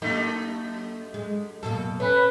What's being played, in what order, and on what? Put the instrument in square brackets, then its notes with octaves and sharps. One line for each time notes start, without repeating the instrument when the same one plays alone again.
[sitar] F#2 A3 D#4 [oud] A#3
[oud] G#3
[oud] F#2 B2 A#3 [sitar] A4
[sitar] A3 [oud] C#4 [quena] B4